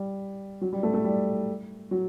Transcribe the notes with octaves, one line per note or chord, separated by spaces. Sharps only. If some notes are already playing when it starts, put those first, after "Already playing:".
Already playing: G3
F#3
G3
A3
A3
G3
F#3